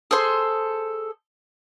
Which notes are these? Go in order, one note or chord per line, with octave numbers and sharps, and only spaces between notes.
G#4 A4 C5 C6